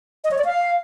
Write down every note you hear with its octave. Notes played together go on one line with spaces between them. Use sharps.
D#5
C#5
D5
F5